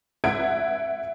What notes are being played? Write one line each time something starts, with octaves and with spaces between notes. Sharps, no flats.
E5 F#5 G#6 D7